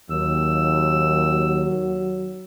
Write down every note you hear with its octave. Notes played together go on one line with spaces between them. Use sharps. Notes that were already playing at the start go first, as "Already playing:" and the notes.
D#2 F#3 E6